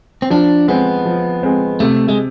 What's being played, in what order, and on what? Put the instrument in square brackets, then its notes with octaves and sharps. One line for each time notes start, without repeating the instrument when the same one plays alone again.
[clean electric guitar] C4
[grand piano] F3 [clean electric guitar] D4
[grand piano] G#3 C4 [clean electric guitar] B3
[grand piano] F3
G#3 C4
[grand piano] C3 [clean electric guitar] A3
[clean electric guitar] G#3